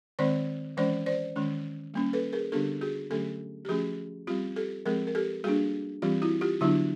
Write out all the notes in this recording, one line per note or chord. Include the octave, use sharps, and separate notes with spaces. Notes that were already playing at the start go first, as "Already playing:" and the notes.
D#3 G#3 C4 C5 D5
E3 G#3 C#4 C5 D5
C5 D5
D#3 G#3 C#4
G3 A#3 C#4
A4 B4
G#4 A#4
D3 G3 B3 D4 G4 A4
F#4 G#4
D3 F#3 A3 C#4 G4 A4
G4
F3 A3 C#4 F#4 G#4
G3 C4 F4 G4
G4 A4
F3 G#3 C4 G#4 A#4
A#4
G4 A4
G3 A#3 D4 F#4 G#4
E3 G3 C4 F4 G4
E4 F#4
F4 G4
D3 F#3 B3 D4 E4 F#4